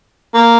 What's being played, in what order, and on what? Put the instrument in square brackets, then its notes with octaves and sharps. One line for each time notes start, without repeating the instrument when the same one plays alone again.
[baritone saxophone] A#3